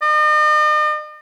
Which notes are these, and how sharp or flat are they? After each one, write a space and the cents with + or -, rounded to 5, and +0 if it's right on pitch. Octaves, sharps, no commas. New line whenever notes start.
D#5 -45